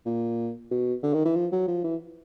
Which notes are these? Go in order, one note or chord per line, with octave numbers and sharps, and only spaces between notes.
A#2
B2
D3
D#3
E3
F3
F#3
F3
E3